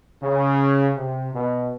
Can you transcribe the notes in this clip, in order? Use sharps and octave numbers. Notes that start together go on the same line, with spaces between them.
C#3
C3
B2